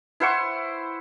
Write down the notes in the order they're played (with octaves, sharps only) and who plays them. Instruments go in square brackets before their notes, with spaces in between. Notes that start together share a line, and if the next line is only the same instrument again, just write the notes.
[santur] E4 C5 F#5 C#6